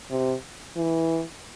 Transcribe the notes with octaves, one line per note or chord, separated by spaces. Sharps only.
C3
E3